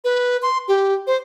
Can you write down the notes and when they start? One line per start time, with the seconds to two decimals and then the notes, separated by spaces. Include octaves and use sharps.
0.04 B4
0.42 C6
0.68 G4
1.07 C5